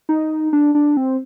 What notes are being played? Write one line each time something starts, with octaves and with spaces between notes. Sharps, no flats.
D#4
D4
D4
C4